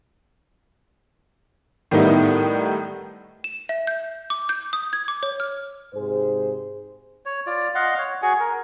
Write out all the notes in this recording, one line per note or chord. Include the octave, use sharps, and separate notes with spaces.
A2 D#3 G3 B3 D#4 E4
E7
E5
G6
D6
G6
D#6
G#6
D6
C#5
F6
G#2 C3 G#4 C5
C#5
F4 D5
D#5 F5 F#5 C6
C#5
F#4 G#4 G#5 C#6
A#4